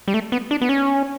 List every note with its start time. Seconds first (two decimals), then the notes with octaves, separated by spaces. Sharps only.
0.08 G3
0.14 A3
0.32 B3
0.51 D4
0.62 B3
0.69 C#4